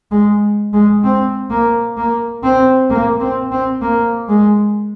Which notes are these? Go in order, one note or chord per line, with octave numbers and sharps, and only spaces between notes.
G#3
G#3
C4
A#3
A#3
C4
A#3
C4
C4
A#3
G#3